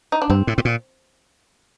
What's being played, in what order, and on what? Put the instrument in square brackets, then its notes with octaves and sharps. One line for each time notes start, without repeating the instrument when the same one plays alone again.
[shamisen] D#4
D4
[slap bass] G2 [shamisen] C4
[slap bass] A2
A2
A#2